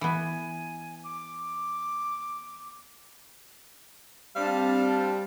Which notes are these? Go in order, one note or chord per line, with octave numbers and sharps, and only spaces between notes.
E3 B3 G#5
D6
G3 C4 D4 F5 A5